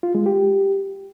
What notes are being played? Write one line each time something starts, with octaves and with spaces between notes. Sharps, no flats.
F4
G#3
G4